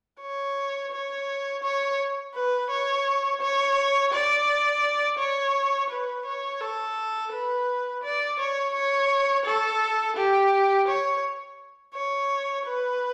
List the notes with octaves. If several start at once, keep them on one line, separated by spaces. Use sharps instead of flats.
C#5
C#5
C#5
B4
C#5
C#5
D5
C#5
B4
C#5
A4
B4
D5
C#5
C#5
A4
G4
C#5
C#5
B4